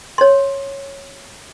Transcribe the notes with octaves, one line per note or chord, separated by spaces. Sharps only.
C#5 C6